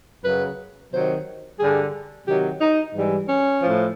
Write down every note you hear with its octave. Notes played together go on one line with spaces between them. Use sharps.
F#2 C#3 F#3 B4
C3 D#3 F#3 C5
G2 D3 G3 G#4
C3 D#3 F#3 G4
D#4
G#2 E3 G3
C#4
A2 F3